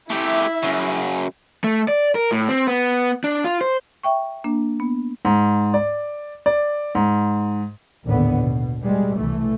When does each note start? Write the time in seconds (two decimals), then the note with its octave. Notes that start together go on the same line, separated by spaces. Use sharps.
0.10 A3 E4 G4 E5
0.63 F#2 C#3
1.64 A3
1.88 D5
2.15 A#4
2.32 A2
2.49 C4
2.67 B3
3.24 D4
3.44 F4
3.61 C5
4.03 E5 G5 C#6
4.44 A#3 D4
4.80 B3
5.25 G#2
5.74 D5
6.46 D5
6.95 G#2
8.05 A1 D#2 A#2 D3 B3
8.38 B2
8.82 B2 G3 G#3
9.16 C2 E3 A3